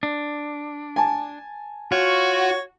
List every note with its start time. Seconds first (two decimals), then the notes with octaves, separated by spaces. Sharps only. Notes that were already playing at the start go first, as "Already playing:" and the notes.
0.03 D4
0.96 G#5 A5
1.92 F4 F#4 C#5